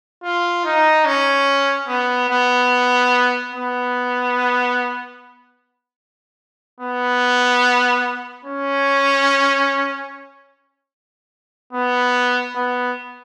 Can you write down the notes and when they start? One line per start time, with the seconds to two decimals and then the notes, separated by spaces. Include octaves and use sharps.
0.24 F4
0.65 D#4
1.06 C#4
1.88 B3
2.29 B3
3.52 B3
6.81 B3
8.45 C#4
11.73 B3
12.55 B3